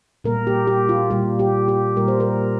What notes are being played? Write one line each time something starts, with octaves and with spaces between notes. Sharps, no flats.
A#2 G3 A#3 A#4
G4
G4
F4
A#2 G3 A#3 G4
G4
G4
A#2 G3 A#3 A#4
C5
A#4